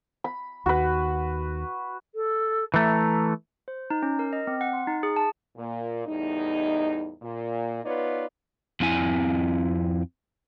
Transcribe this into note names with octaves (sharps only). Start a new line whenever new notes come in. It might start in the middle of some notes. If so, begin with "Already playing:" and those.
B5
D#2 F#4 B4
A4
E3 A3 A#5
C5
D#4
C#4
A#4
D#5
C4
F#5
C6
D#4
G#4
A5
A#2
E2 A2 G3 D#4
A#2
B3 D#4 F4 B4 C#5 D5
F2 C4 E4 G#5